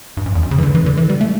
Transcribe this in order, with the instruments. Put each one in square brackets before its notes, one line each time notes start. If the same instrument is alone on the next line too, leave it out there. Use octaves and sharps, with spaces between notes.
[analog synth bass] G2
F#2
E2
F#2
C#3
E3
D3
E3
D3
E3
G3
A3